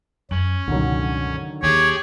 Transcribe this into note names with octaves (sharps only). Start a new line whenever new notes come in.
F#2 C#4 F#7
C#2 G2 B2 D3 D#3 F#3
D#2 G4 G#4 C#5 D5